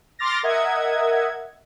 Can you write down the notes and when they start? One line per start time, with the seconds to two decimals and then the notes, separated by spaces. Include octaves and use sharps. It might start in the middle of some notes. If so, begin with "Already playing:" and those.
0.19 C6 D6 F6 A6 A#6
0.43 A#4 D#5 E5 F#5 G#6